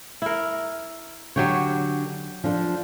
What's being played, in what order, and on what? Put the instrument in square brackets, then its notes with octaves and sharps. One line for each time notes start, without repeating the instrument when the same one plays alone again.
[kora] E4 A#4
[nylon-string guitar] D3 [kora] F#3 G4 C#5
[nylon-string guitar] F3 D4 A4